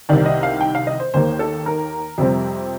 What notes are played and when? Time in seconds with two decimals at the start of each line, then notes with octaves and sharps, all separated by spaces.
0.09 C2 C3 D#3 D5
0.25 D#5
0.43 F5
0.61 G5
0.75 F5
0.87 D#5
1.00 C5
1.14 D#2 D#3 A#3 C5
1.39 A4
1.66 A#4
2.18 F2 C3 G3 C4